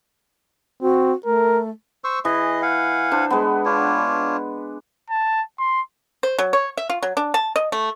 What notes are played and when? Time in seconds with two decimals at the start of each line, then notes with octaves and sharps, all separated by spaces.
0.82 C4 F#4
1.26 A3 A#4
2.04 C5 C#6 E6
2.25 E3 G#4 D#5
2.62 F5 F#5 G#5
3.11 D4 C5
3.30 G#3 B3
3.65 D4 F4 C#5
5.10 A5
5.59 C6
6.23 C5
6.39 F#3
6.53 C#5
6.77 E5
6.90 F4
7.03 F#3
7.17 D4
7.34 A5
7.56 D#5
7.72 A3